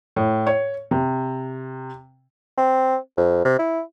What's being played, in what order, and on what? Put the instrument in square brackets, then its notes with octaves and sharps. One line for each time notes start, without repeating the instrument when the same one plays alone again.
[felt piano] A2
C#5
C3
[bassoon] C4
F2
C3
E4